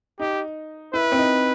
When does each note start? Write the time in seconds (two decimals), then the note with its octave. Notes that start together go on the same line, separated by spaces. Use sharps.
0.19 D#4 G4
0.94 E4 B4
1.12 C4
1.18 D#4